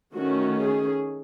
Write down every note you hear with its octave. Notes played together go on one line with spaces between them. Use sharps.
D#3 A3 C#4 F#4
G#4